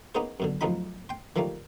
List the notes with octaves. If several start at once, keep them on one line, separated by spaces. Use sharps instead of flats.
A#3 B3 C#4 D#4 G#4 C5
F#2 B2 D3
A1 F2 F3 F#3 D#4 B5
G5 C6
D#3 F3 G3 A3 A#3